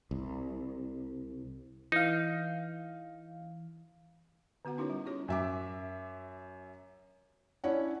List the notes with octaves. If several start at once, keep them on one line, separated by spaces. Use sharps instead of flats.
C2
E3 D#4 F5
D3 B3 F#4 F#5
C#4 D#4 E4 F#4 A#4 C#5
G3
C#4 E4 F4 G4 G#4 C#5
F#2 E5 D6
C#4 D4 E4 C#5 F#5